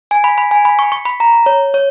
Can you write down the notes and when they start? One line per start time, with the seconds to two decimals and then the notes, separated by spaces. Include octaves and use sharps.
0.11 G#5
0.24 B5
0.38 B5
0.51 G#5
0.65 B5
0.79 C#6
0.92 C#6
1.05 B5
1.20 A#5
1.46 C#5
1.74 C#5